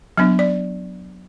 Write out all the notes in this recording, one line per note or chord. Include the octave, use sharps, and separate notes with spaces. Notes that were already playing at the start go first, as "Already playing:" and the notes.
F#3 B3 D4
D5